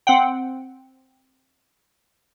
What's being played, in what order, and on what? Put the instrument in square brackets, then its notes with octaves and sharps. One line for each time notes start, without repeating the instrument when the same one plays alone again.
[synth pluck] C4 F#5 G5